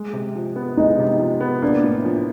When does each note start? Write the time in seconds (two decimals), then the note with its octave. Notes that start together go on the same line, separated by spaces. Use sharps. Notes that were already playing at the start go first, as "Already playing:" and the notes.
Already playing: G#3
0.13 C3
0.36 F3
0.56 B3
0.77 G#3 D#4
0.99 C3
1.20 F3
1.41 B3
1.62 A#3 D4
1.84 A2
2.05 F3